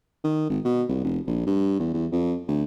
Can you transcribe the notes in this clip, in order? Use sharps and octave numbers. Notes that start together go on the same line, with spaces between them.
D#3
G#1
B2
C2
F1
A#1
G2
E2
E2
F2
D2